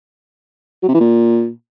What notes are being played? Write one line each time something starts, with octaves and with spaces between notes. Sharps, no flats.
F#3
C3
E3
A#2